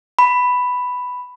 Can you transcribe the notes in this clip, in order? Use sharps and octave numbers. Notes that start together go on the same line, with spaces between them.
B5